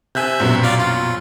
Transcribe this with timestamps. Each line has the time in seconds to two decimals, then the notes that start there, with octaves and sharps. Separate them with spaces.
0.15 C3 E5 G#5 F#6 G6
0.40 A#1 F#2 B2
0.63 F4 D5 F5
0.80 F4